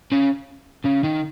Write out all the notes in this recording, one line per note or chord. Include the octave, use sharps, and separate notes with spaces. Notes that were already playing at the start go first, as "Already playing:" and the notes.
C#3
C#3
D#3